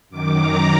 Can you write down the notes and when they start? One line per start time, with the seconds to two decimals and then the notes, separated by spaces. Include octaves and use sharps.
0.10 F#2 D#3 D6
0.40 A#5